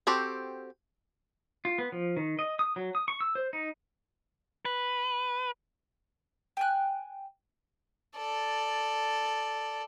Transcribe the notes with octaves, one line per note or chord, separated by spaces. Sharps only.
C4 F#4 G4 A4 C5
F4
B3
F3
D#3
D#5
D#6
F#3
D#6
C#6
E6
C5
D#4
B4
G5 G#5 F#6
A4 D5